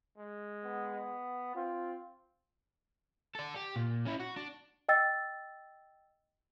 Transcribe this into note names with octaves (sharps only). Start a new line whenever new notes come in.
G#3
B3
C4 F4
A4 D5
G4
A#2
C#4 E4
F#4
D4
D#5 G5 E6 A6